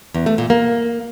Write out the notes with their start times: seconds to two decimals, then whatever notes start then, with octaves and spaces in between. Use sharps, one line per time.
0.14 E2
0.26 A3
0.38 A#2
0.50 A#3